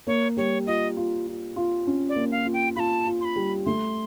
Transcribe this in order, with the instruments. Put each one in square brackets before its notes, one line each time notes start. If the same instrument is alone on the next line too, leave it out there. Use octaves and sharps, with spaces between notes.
[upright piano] A#3 [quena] C#5
[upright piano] G3 [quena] C#5
[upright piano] F4 [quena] D#5
[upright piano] F4
F4
F4
C#4
[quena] D5
[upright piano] A#3
[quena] F5
[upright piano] F4
[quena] G5
[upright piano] F4 [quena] A5 B5
[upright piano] F4
[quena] C6
B5
[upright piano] G3
[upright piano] A3 [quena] C6